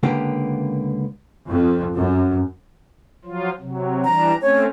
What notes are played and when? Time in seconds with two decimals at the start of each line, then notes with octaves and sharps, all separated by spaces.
0.03 C#2 D3 A#3 B3 G4
1.48 F2
1.93 F#2
3.25 F3 F#3 F4
3.60 C3 F#3
4.04 E3 G3 D4 A#5
4.42 A3 C4 C#4 C#5